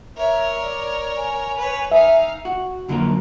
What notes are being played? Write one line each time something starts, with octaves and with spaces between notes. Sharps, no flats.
A#4 C#5 E5
D5
G#5
B4 C#5
D#4 E5 F5
F#4
F2 D3 F#3 A3 A#3 A#4